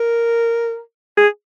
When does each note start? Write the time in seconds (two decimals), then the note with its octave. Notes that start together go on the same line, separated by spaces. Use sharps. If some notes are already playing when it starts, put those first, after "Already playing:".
Already playing: A#4
1.18 G#4